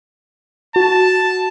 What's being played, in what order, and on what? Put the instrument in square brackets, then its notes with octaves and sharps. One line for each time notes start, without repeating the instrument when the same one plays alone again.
[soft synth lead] F#4 [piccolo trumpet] A5